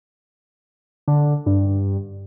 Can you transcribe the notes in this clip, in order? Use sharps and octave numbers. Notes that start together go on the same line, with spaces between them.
D3
G2